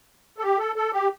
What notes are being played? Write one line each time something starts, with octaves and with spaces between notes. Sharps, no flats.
A4
G4
A4
A4
G4